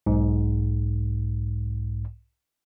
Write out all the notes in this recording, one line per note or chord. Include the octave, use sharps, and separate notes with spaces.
B1 G#2